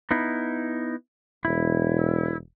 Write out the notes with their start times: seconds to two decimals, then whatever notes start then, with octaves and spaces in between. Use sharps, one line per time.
0.11 B3 D#4 E4
1.45 E1 E4